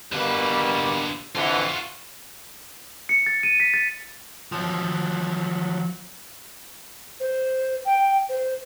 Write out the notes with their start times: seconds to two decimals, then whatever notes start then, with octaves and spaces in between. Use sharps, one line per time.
0.12 B2 D3 G3 A#3 B4
1.35 F2 D3 E3 F4 F#4
3.09 C#7
3.26 A6
3.43 D#7
3.60 B6
3.74 A6
4.52 F3 F#3
7.20 C5
7.85 G5
8.28 C5